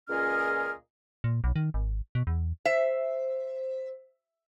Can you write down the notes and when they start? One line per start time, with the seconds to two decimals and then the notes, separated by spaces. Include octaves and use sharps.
0.10 C#2 A#2 C#4 G#4 D#5 F6
1.24 A#2
1.44 B1
1.56 D#3
1.74 G#1
2.15 B2
2.27 E2
2.65 C5 E5